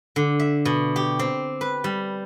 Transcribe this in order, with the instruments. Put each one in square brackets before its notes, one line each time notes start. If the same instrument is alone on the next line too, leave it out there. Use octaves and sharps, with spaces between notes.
[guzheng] D3
E5
B2
G4
C4
B4
G3